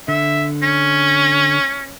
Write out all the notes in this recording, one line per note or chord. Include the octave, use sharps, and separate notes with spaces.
D3 E5
C#4